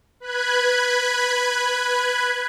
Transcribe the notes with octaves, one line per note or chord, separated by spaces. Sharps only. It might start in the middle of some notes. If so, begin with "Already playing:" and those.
B4 B5 F#6 G#6